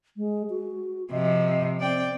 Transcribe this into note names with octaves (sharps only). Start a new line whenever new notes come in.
G#3
F#4
C3 F3 D#5
C4 D5 G5